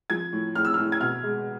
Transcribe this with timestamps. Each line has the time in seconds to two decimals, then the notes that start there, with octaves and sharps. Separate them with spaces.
0.10 F3 G#6
0.32 A2
0.55 A2 F6
0.65 E6
0.74 A2 F6
0.92 G#6
1.01 B2 F6
1.23 G#3